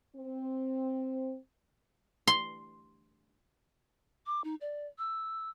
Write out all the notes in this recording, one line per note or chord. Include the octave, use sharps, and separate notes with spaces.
C4
C6
D6
D#4
D5
E6